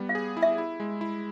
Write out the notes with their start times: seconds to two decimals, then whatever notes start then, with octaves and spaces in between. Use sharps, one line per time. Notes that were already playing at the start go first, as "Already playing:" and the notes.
Already playing: G3 B3
0.09 F5
0.15 G#4
0.37 E4
0.43 E5
0.58 E4
0.80 G#3
1.01 E4